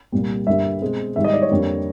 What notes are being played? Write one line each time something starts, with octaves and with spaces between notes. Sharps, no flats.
C2 A#2 G3
G2 D3 G3 A#3 E5
B2 G#3 C4
G#2 D#3 G3 E5
D#5
D5
C#5
F2 D3 G3 A#3 D4